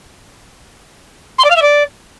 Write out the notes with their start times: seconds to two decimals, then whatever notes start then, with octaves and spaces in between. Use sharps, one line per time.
1.38 C6
1.44 D5
1.50 F5
1.56 E5
1.62 D5